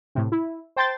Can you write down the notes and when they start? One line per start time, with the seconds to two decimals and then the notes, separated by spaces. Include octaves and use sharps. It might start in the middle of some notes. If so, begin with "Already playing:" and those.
0.15 A2 C3
0.32 E4
0.76 C5 G5 A5 C6 G6 A6